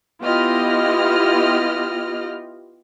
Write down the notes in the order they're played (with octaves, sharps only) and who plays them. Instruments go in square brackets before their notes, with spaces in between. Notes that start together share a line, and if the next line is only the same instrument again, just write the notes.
[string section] B3 E4 F4 G4 D#5 F6